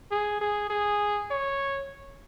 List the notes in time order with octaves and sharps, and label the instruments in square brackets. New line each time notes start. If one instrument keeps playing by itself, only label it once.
[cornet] G#4
G#4
G#4
C#5